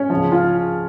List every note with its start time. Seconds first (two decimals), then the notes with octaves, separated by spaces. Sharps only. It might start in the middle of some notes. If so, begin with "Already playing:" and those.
Already playing: C#4
0.10 C#2 C#3 F3
0.32 F4